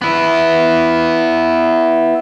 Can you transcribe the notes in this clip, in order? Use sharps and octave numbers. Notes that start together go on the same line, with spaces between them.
B3 E4